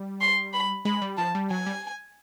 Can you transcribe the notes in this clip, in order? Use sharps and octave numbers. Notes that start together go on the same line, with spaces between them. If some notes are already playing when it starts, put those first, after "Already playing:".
Already playing: G3
C6
B5
G#3 B5
G3
F3 A5
G3
F#3 G#5
G3